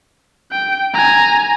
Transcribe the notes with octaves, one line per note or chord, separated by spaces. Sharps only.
G5
G#5 A#5